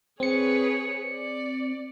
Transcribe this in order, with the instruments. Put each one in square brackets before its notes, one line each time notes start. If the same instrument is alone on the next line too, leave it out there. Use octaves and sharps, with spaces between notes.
[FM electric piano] C4 C#7 [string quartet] G#4 B4 C#5
[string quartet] D5